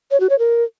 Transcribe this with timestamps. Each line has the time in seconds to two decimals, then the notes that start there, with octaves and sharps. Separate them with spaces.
0.11 C#5
0.20 F#4
0.30 C#5
0.39 A#4